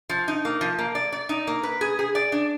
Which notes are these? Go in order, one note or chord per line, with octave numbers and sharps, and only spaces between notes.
F3
D#4
A#3
F3
A#3
D5
D5
D#4
A#3
B4
G#4
G#4
D5
D4